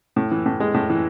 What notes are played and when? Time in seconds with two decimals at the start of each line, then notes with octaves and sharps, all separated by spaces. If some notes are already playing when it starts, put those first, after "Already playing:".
0.16 A2
0.31 E3
0.46 A2
0.60 G#3
0.74 A2
0.90 E3